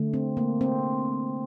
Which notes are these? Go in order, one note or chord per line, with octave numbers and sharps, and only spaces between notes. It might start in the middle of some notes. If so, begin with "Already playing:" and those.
Already playing: D3 A3
C4
A#3
C4